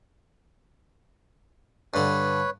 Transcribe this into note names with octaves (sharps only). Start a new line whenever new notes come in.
G2 D3 B4 C#5